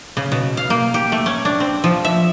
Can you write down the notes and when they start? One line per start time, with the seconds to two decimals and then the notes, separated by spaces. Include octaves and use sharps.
0.17 C#3
0.32 B2
0.57 F5
0.70 A#3
0.94 G4
1.12 A3
1.26 C#4
1.45 D4
1.60 C4
1.84 F3
2.05 E5